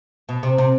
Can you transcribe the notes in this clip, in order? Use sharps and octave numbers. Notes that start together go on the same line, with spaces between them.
B2
C3
C3